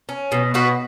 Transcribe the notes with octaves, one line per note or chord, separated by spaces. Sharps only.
C#4
B2
B2 F#4 B4